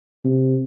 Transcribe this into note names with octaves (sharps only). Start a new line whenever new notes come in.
C3